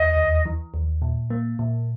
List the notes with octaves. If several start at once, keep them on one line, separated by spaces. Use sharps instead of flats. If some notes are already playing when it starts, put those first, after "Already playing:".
Already playing: E2 D#5
D#2
E3
D#2
A#2
A#3
A#2